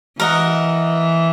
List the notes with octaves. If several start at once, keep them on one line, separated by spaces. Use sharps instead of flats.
E3 A#4 D#5 F#5